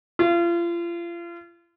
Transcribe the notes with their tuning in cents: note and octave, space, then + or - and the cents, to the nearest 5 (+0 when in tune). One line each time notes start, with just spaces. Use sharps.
F4 -35